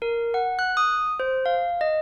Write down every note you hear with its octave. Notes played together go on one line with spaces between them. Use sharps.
A#4
F#5
F#6
D#6
C5
F5
D#5